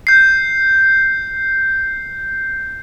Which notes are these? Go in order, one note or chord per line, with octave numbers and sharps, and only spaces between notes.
G6 C7